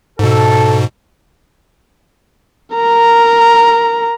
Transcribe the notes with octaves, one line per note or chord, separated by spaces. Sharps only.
G#2 B2 A4
A#4 A#5